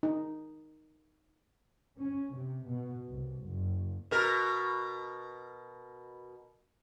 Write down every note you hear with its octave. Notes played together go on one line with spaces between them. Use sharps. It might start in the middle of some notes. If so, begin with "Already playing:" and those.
D#4
C#4
C3
B2
C2
F#1
B2 A#4